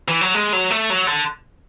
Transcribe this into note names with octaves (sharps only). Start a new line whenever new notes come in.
E3
F#3
G#3
F#3
A3
F#3
D3